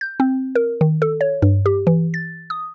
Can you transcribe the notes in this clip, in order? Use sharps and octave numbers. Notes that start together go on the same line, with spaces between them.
G6
C4
A#4
D#3
A4
C#5
G2
G4
E3
A6
D#6